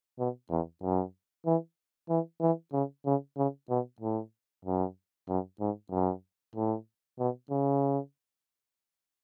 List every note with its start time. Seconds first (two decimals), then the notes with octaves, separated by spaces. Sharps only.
0.19 B2
0.50 E2
0.83 F#2
1.46 E3
2.09 E3
2.41 E3
2.73 C#3
3.05 C#3
3.37 C#3
3.70 B2
4.00 A2
4.65 F#2
5.29 F#2
5.60 G#2
5.92 F#2
6.56 A2
7.19 B2
7.51 C#3